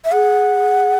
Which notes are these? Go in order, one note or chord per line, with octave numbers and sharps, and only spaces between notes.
E5
G#4 F#5